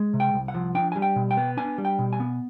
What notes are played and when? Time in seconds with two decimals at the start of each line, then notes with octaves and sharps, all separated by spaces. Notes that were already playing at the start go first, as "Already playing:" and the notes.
Already playing: G#3
0.13 C3
0.20 G5
0.34 C2
0.48 F#5
0.54 F3
0.75 D4 G5
0.92 G3 G#5
1.02 G5
1.16 B2
1.31 G5
1.37 B3
1.57 D4 G#5
1.78 G3
1.85 G5
1.99 B2
2.13 G#5
2.20 B3